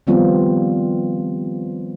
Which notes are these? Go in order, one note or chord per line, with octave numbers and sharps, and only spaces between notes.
D#3 F3 G3 B3 C4 F4